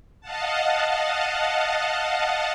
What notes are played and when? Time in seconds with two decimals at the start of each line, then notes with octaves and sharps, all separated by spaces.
0.21 D#5 F5 F#5 A5